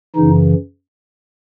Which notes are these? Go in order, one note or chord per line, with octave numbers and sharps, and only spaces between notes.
F#2 C#3 E3 D#4